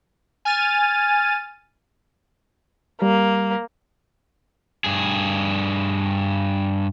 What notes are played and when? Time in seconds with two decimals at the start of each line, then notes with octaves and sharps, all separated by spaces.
0.45 G#5 F6 A6 D#7
3.02 G3 A#3
4.84 G2 G#4